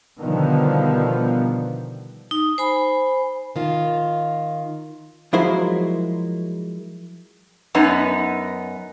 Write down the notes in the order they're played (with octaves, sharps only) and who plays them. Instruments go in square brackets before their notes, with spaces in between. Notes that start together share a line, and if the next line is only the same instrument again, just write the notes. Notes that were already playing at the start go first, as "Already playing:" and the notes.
[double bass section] B2 D3 D#3 F3 G3 B3
[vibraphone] D#4
C5 G#5 B5
[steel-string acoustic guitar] D#3 F4
[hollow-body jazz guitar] F3 F#3 G#3 E4 A#4 C5
[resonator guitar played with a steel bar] F#2 B3 D#4